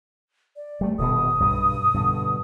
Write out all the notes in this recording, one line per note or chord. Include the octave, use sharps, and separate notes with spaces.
D5
G3 A3
D#1 G2 B2 D#6
B1 G2
G2 B2 D3